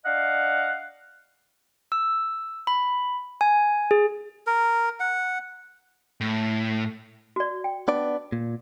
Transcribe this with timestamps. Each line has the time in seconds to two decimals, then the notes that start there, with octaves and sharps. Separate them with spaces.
0.06 D4 D#5 F5 F#5
1.92 E6
2.67 B5
3.41 G#5
3.91 G#4
4.47 A#4
5.00 F#5
6.21 A2
7.36 F#4 D5
7.64 G5
7.88 B3 D4 D5
8.32 A#2